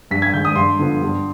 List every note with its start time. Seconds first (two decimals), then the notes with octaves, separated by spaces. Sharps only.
0.11 G2 B6
0.22 G#6
0.33 D#3 G6
0.37 G#3
0.45 D#6
0.56 G2 C6
0.79 D3 F3 B3
1.02 G2